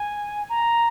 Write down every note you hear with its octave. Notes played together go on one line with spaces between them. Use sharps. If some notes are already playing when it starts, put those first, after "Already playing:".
Already playing: G#5
A#5